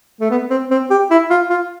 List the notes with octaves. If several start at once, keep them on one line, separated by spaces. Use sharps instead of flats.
A3
B3
C4
C4
G4
E4
F4
F4